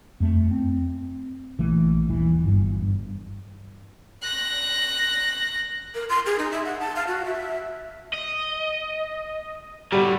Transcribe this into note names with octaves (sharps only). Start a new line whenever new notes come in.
F2 A3
C4
A#1 E3 A3
D#1 E3
G1 G2
F#6 A#6
A#4
C6
G#4
D#4
E5
F#5
A5
F5
F#4
E5
D#5
A2 D3 G3 F#4